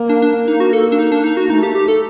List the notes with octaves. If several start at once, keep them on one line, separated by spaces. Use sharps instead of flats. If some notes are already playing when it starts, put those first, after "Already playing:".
Already playing: A#3
D4
D4
A#3
D#4
F#4
A4
D4
D#4
D4
D#4
F#4
A3 D#4
G4
G4
A4